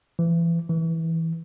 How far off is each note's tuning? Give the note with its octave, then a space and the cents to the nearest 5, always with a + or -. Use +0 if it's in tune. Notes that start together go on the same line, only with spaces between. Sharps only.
E3 +30
E3 -15